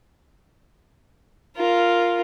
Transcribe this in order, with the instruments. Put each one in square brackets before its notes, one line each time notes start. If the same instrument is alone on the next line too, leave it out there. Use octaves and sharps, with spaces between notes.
[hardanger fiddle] F4 A#4